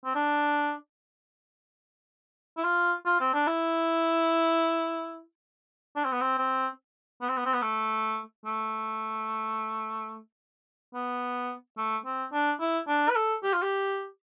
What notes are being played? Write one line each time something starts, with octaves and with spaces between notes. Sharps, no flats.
C4
D4
E4
F4
F4
C4
D4
E4
D4
C4
B3
C4
C4
B3
C4
B3
C4
B3
A3
A3
B3
A3
C4
D4
E4
D4
B4
A4
G4
F4
G4